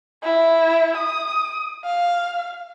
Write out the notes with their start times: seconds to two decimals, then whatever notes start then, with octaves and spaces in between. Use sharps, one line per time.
0.23 E4
0.97 D#6
1.85 F5